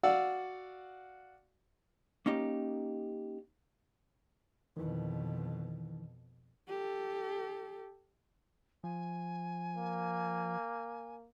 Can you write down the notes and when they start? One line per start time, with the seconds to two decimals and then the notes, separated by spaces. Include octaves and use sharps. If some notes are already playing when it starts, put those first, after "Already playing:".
0.03 F#4 D5 F5 F#5 E6
2.26 A#3 C#4 D#4 G4
4.77 F2 B2 D#3 E3
6.69 G4 A4
8.84 F3 G#5
9.76 A#3